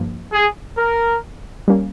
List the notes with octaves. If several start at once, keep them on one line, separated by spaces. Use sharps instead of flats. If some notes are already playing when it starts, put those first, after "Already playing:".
Already playing: G2 F3 A#3
G#4
A#4
G3 A#3 C#4